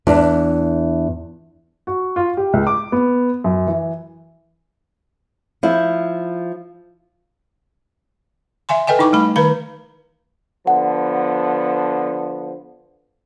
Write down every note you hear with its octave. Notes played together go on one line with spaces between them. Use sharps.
E2 D4
F#4
F4
G4
C#2
D6
B3
F#2
E3
F3 E4
E5 F5 G#5 C6
A4 B4 D#5 G5 G#5
D#4 E4 C#6 D6
G3 A3 B5
D#3 B4 F5 B5
D3 F3 B3 F#5